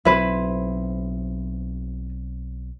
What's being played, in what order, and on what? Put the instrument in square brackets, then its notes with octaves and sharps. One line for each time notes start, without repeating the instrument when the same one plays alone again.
[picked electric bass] B1 F#3 C4 [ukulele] E4 B4 C5